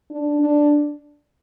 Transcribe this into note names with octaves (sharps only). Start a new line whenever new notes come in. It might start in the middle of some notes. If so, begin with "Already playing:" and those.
D4
D4